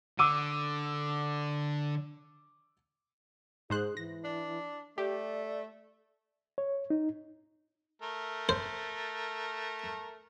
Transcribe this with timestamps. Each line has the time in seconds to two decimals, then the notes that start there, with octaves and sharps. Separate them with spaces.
0.19 D3 D6 E6 D#7
3.70 G#2 G#4 C5 F#6
3.97 E3 A#6
4.24 D4
4.98 A3 G4 D5
6.58 C#5
6.90 D#4
8.02 A3 A#4
8.49 C5